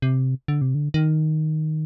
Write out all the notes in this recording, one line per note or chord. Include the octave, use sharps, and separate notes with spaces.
C3
D3
C3
D3
D#3